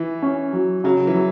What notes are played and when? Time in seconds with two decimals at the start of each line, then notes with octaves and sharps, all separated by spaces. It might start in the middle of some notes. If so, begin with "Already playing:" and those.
Already playing: E3
0.22 C#4
0.53 F#3
0.84 C#3 F#3
1.07 E3
1.15 F#3